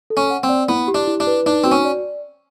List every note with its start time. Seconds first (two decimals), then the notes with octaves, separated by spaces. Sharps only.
0.10 A4
0.17 C#4
0.30 F#5
0.43 C4
0.49 D5
0.69 B3 E4
0.88 G4
0.95 D4
1.08 E4
1.20 D4
1.27 B4
1.46 D4 D#4
1.64 C4 F#4
1.72 C#4
1.85 D5